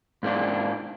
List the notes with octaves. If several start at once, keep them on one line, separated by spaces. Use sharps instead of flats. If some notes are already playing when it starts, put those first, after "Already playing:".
G#2 A#3 D4